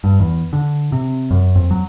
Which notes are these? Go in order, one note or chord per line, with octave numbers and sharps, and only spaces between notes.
G2
E2
D3
C3
F#2
F2
F#3